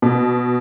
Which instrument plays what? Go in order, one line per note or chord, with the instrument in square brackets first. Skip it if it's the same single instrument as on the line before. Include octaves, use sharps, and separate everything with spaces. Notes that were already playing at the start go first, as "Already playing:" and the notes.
[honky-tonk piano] B2